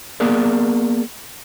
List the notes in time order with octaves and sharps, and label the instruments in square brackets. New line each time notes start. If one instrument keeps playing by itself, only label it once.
[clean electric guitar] A#3 B3 G#4 A#4 D5